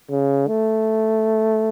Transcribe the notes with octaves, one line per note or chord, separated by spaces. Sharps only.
C#3
A3